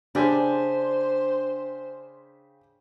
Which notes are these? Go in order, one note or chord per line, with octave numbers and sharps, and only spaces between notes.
C#3 D4 G4 C5 G#5